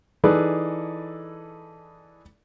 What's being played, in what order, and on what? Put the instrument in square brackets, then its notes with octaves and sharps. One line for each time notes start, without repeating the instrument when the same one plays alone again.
[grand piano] E3 D#4 G#4 A4 B4 D5